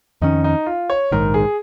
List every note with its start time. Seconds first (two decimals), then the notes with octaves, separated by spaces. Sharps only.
0.22 F2 D#3 C#4 D#4
0.44 D#4
0.66 F4
0.90 C#5
1.11 A#1 G#2 D#3 A#4
1.34 G#4